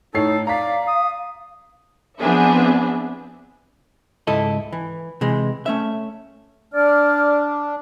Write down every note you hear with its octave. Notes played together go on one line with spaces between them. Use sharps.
A2 D#4 A4 C#5 C7
D5 F5 A#5 B6
D#6
F3 B3 C4 D4 G#4 E5
C#2 G#2 E4 A4 D#5
E3
C3 E3 G#3
A3 C#4 E5
D4 D5 F6